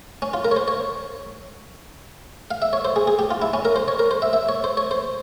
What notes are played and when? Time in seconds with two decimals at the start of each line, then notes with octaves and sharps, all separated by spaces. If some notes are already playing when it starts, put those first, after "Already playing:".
0.22 C#4
0.34 F4
0.45 A#4
0.51 C#5
0.57 C5
0.68 C#5
2.51 F5
2.62 E5
2.73 C#5
2.85 C5
2.96 G#4
3.07 G#4
3.19 G4
3.31 F4
3.42 E4
3.54 C#4
3.65 A#4
3.76 C5
3.88 C#5
3.99 A#4
4.11 C5
4.22 E5
4.33 E5
4.49 C#5
4.64 C5
4.77 C#5
4.91 C5